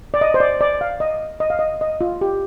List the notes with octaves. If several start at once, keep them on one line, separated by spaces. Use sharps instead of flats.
D5
D#5
C5
D5
D5
F5
D#5
D#5
F5
D#5
D#5
F4
G4